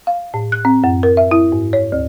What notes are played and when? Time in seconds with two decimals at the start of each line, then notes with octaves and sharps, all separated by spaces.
0.07 F5
0.34 A2
0.52 F#6
0.65 C4
0.84 F#2
1.03 A#4
1.17 E5
1.31 E4
1.52 G#2
1.73 C#5
1.92 D2